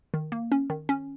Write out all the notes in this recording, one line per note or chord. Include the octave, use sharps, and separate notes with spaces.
D#3
A#3
C#4
D#3
C#4